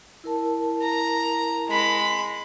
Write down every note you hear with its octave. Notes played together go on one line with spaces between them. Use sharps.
E4 A#4 A5
A#5
G#3 B5